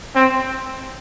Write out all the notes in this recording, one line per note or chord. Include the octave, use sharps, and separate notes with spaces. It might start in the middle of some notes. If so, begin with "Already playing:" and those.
C4